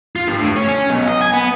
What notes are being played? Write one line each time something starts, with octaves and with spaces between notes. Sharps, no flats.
F4
G2
A2
C#4
C#4
B1
D#5
G#5
B3